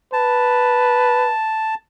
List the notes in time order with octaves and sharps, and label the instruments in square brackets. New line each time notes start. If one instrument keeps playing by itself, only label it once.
[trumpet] B4 [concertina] A5